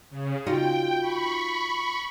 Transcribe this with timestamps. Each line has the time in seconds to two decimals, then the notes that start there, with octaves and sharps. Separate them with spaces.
0.10 C#3
0.47 D#4 F4 F#4 G5
0.99 B5 C#6